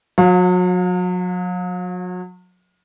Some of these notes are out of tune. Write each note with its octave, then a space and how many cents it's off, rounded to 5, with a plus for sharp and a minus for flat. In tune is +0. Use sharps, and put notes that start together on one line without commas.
F#3 -35 F5 +40